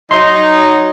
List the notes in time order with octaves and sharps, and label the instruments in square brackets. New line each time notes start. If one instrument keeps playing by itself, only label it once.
[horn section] F#3 D#4 [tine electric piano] C6